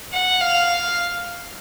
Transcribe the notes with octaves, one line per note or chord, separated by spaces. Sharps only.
F#5
F5